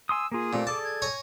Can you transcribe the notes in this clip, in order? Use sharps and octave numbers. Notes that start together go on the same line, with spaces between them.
G#5 C6 D#6 E6
A#3 F4 G#4
A#2 A3 C4 G4
G#4 A4 D5 A5 D6
G#6
C#5 G#5 A#5